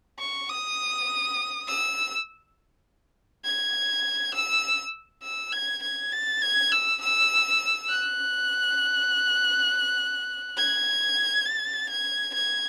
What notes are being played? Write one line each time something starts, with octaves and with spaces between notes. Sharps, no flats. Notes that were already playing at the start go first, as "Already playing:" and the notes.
C#6
D#6
E6
G#6
E6
E6
G#6
G#6
A6
G#6
E6
E6
F#6
G#6
A6
G#6
G#6